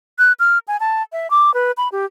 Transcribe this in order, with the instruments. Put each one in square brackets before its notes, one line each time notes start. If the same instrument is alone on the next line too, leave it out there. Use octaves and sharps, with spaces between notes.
[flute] F#6
F6
G#5
A5
E5
D6
B4
B5
G4